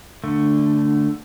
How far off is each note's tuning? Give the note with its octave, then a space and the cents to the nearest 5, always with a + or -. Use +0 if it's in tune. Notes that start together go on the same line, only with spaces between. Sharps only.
D3 +0 A3 +10